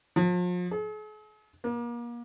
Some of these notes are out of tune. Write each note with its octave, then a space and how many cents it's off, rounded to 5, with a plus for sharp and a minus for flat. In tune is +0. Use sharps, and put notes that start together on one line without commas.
F3 +40
G#4 +45
A#3 +35